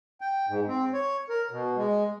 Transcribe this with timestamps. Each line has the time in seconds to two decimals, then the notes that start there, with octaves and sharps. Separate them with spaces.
0.21 G5
0.49 G#2
0.68 C4
0.94 C#5
1.30 A#4
1.51 B2
1.77 G#3